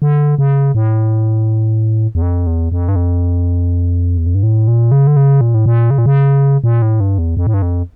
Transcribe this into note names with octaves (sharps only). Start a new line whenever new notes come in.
D3
C#3
A2
E2
F2
E2
F2
G2
F2
E2
F2
G2
A2
A#2
C#3
D3
C#3
A#2
A2
A#2
C#3
A#2
C#3
A#2
A2
G2
E2
F2
A2
G2
F2